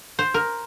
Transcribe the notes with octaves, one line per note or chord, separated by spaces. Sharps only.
C5
A#4